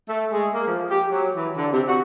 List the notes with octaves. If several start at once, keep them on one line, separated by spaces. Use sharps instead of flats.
A3
G#3
A#3
F3
G4
F#3
E3
D3
C3
F#4